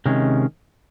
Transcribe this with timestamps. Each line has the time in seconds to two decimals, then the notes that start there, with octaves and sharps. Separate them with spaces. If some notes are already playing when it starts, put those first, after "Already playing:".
0.06 C3 D#3 G#3 C#4